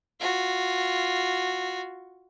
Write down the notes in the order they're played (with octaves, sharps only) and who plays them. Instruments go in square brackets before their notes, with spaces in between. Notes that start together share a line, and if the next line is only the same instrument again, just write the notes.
[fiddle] F4 F#4